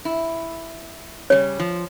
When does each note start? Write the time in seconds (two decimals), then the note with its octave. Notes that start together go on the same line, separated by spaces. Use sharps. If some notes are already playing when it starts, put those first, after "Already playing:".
0.05 E4
1.30 C#3 G3 C#5
1.60 F3